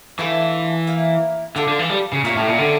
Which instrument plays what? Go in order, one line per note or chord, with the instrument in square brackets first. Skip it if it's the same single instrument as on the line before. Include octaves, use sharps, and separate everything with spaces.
[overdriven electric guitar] E3 [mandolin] A3 D4 F4 A4
[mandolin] A#3 E4 A#4
[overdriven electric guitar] D3 [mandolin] F4 A4 D5
[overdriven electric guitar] D3
E3
G3
C#3
[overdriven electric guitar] A#2 [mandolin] C#4 E4 G4 A#4
[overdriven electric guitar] A2
A#2
D3